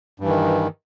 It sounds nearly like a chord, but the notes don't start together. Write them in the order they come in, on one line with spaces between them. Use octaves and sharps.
G2 E3 D#3